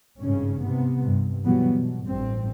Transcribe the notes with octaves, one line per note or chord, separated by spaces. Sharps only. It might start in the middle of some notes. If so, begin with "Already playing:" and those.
G#1 G2 C#3 C#4
C3 B3
G2
B2 E3 F#3 G3 B3
B2
A1 G2 C4